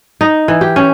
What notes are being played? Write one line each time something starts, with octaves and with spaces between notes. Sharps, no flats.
D#4
E3
G4
C#4